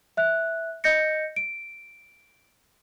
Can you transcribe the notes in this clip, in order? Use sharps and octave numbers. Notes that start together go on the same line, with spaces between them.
E5 F#6
D#5 G6 A#6 C#7
D7